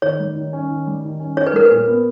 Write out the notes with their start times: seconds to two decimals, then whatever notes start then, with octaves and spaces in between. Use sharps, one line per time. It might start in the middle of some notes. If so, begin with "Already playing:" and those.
0.02 D#3 C#5
0.19 G3
0.36 D#3
0.53 C#4
0.70 D#3
0.87 G3
1.04 D#3
1.20 C#4
1.37 D#4 C#5
1.47 B4
1.53 G3 A#4
1.65 B4
1.71 A#2
1.87 B3